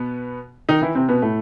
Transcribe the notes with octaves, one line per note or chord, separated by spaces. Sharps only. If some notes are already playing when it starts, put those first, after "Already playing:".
Already playing: B2 B3
D#3 D#4
E3 E4
C3 C4
B2 B3
A2 A3